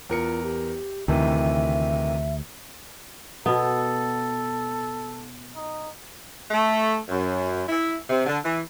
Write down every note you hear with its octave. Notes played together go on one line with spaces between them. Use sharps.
E2 F4 A#4 C#7
G4
D2 C3 D#3 E3 E5
B2 B3 A4
D#4
A3
F#2
E4
C3
D3
E3